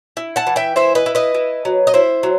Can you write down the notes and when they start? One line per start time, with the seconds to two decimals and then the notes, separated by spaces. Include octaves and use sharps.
0.17 E4
0.36 F#5 A5
0.47 E3
0.56 E5 G5
0.76 E4 C5 E5
0.95 B4 D#5
1.06 E4
1.15 B4 D#5
1.35 E4
1.65 F#3
1.87 D#5
1.94 E4 C5 E5
2.23 F#3